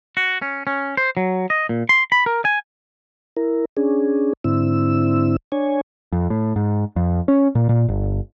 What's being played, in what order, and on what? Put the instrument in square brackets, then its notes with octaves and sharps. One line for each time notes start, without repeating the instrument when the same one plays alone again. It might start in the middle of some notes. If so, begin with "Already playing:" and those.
[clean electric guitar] F#4
C#4
C#4
C5
F#3
D#5
A#2
C6
B5
A#4
G#5
[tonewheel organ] E4 A#4
C#4 D4 G#4
G#2 D3 C4 E4 E6
D4 C#5 G#5
[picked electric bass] F2
A2
G#2
F2
C#4
A#2
A#2
G1